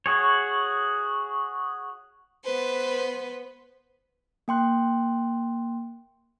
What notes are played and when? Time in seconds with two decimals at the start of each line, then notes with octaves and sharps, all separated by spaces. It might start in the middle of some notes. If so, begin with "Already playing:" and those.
0.06 F#4 G#4 C#5
2.44 B3 B4 C5
4.48 A#3 G5 C6 F#6